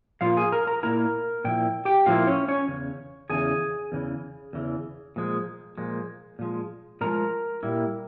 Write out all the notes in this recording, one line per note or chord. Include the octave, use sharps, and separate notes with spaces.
A#2 F3 A#3 F4 F5
G#4 G#5
A#4 A#5
A#4 A#5
A#2 F3 A#3 E4 A#4 A#5
A#2 F3 E4 G5
G4 G5
A#2 F3 A#3 E4 F4 F5
C#4 C#5
C#4 C#5
E2 C#3
E2 C#3 E3 G#4 G#5
E2 C#3 E3
E2 C#3 E3
A#2 F3 G#3
A#2 F3 G#3
A#2 F3 G#3
A#2 F3 G#3 A#4 A#5
A#2 G3 A#3 E4